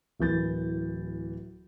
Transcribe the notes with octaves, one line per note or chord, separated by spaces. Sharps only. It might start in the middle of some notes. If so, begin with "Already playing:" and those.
D1 E3 A#4 G6 A6